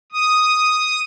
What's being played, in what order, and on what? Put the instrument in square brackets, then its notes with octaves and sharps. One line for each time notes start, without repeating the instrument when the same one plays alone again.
[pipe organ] D#6